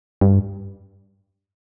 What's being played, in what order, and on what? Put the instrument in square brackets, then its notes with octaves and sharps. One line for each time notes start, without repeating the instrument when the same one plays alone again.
[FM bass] G2